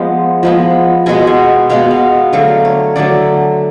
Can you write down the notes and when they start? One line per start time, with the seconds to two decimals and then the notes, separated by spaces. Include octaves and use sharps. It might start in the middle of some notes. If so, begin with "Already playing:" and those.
Already playing: F3 G#3 B3
0.43 F3 G#3 B3
1.06 B2 G#3 B3 G#5
1.27 G#5
1.69 B2 G#3 B3 F5
1.91 F5
2.33 D3 F#3 A3 F5
2.65 C#5
2.96 D3 F#3 A3 D5